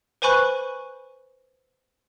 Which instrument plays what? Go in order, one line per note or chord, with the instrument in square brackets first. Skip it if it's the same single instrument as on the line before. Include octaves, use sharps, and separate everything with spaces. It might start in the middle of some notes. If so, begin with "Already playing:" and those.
[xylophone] B4 C5 G#5 B5 C#6 F#6